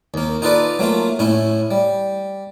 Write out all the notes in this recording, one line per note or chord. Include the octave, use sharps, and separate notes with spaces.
D#2 A#3
D#4 F4 A4 B4 D5
F#3 A3 A#3 F4
A2 C#4 E4
G3